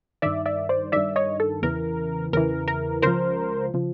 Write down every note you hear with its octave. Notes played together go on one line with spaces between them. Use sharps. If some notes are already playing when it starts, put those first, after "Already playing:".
G2 D#3 D5 E5
D5 E5
C5 D5
G2 D#3 D5 E5
C#5 D#5
A4
E2 C#3 E3 A#4
E2 C#3 E3 A#4
A#4
C#2 C#3 F3 A#4 C5
C#3 F3